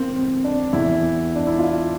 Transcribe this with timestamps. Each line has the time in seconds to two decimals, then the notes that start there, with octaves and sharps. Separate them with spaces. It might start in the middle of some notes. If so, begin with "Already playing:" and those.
Already playing: E3 A#3 C4
0.16 C4
0.44 D4
0.73 E2 E3 E4
1.35 D4
1.47 E4
1.59 F4